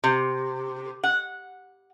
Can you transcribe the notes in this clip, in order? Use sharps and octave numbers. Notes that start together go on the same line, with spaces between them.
C3
F#5